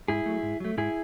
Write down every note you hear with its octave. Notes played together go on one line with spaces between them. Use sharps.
G#2 E4 G#4
F#3 A3
G#2
F#3 A3
G#2 E4 G#4